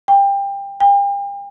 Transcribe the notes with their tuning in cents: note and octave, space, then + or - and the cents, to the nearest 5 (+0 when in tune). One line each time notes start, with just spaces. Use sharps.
G5 +25
G5 +40